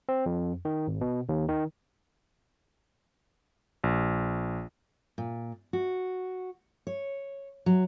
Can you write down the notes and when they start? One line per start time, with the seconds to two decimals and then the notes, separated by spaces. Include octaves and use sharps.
0.09 C4
0.26 F2
0.65 D#3
0.87 G#1
1.01 B2
1.29 D#2
1.48 D#3
3.84 A#1
5.18 A#2
5.73 F#4
6.87 C#5
7.66 F#3